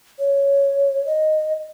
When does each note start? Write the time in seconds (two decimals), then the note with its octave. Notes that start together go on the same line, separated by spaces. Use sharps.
0.19 C#5
1.06 D#5